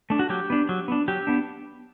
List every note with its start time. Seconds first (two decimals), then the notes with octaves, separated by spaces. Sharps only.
0.10 A3 D4
0.19 F#4
0.29 F#3 G4
0.50 B3 D4
0.69 F#3
0.88 B3 D4
1.08 F#3 G4
1.27 B3 D4